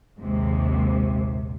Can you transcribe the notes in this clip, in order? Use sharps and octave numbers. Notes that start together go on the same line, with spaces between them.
A#1 D#2 G#2 C3